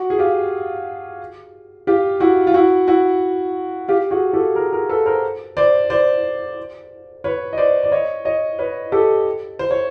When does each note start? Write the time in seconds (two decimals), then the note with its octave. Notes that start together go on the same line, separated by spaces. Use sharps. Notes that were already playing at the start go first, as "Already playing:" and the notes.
Already playing: F#4
0.10 G#4
0.18 F4 G4
1.87 F4 G4
2.20 E4 F#4
2.47 F4
2.54 E4 F#4
2.87 E4 F#4
3.88 F4 G4
4.11 F#4 G#4
4.33 G4 A4
4.55 G#4 A#4
4.72 G#4 A#4
4.89 A4 B4
5.06 A#4 C5
5.57 C5 D5
5.90 C5 D5
7.24 B4 C#5
7.53 D#5
7.57 C5 D5
7.84 D5
7.92 C#5 D#5
8.25 C#5 D#5
8.59 B4 C#5
8.92 G4 A4
9.59 C5
9.71 C#5